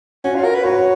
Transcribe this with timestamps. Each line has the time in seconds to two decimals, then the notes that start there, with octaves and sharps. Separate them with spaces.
0.24 C#4 F#4
0.35 F4
0.45 A#4
0.55 B4
0.64 F#4 C#5